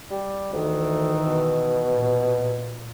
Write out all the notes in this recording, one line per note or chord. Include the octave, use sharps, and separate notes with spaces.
G3
D2 D#3 E3
B2
A#2